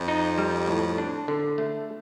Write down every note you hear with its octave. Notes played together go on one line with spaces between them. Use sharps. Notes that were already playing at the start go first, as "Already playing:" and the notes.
Already playing: F2
D#4
G3
A2
D4
D3
A3